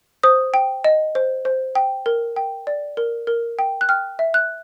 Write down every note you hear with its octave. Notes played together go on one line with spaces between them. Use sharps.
C5 D#6
G5
D#5
C5
C5
G5
A#4
G5
D5
A#4
A#4
G5
F#6
G5 F6
E5
F#6